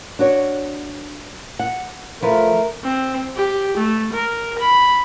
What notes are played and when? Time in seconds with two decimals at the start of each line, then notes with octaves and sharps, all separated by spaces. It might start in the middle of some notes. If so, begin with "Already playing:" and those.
0.19 D4 F#4 C#5
1.59 F#5
2.22 F3 A3 A#4 B4
2.84 C4
3.36 G4
3.77 A3
4.13 A#4
4.59 B5